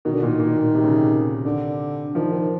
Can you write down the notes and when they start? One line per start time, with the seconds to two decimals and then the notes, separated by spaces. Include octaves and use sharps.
0.05 B2 D#3
0.14 D3
0.22 A#2 D#3
0.40 A#2
0.57 A#2
0.75 C3
0.84 C#3
0.92 C3
1.45 D3
2.15 D#3 F3
2.32 D#3